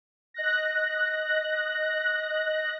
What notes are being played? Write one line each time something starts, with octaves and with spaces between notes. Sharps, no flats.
D#5 F#6 A#6